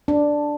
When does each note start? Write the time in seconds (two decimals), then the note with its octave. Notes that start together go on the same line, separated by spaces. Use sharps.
0.08 D4